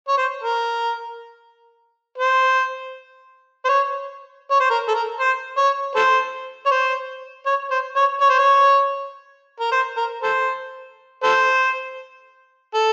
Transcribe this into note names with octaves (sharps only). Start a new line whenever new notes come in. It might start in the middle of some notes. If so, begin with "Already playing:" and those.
C#5
C5
A#4
C5
C5
C#5
C#5
C5
A#4
A4
A#4
C5
C#5
A4 C5
C#5
C5
C#5
C5
C#5
C#5
C5
C#5
A#4
C5
A#4
A4 C5
A4 C5
A4